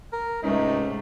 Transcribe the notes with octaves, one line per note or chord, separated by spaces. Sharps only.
A#4
C#2 G#2 C3 A3 C#4 D#4